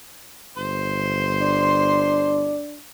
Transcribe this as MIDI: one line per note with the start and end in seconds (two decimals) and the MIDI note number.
0.57 2.56 31
0.57 2.42 72
0.57 2.42 84
1.41 2.81 62